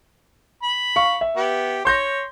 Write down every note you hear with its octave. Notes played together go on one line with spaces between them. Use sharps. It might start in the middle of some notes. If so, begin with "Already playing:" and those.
B5
F5 C#6
E5
B3 G4
C#5 C6 G6 A#6